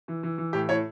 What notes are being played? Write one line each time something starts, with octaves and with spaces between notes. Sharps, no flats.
E3
E3
E3
A2 G4
A2 C#5